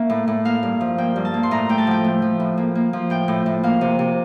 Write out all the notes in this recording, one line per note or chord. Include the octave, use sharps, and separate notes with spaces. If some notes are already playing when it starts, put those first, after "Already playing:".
Already playing: A#3 E5
A2
A2
A#3 F5
G2
F3
A#3 G5
G2
A5
A#3
C6
A2 A#5
A3 G5
A5
F3 G5
A3
F3
A2
A#3
A#3
F3
A2 G5
A2
A2
A#3 F5
C3
C3